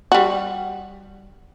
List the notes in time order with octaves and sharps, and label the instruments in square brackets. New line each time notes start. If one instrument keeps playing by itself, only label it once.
[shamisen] G3 F#4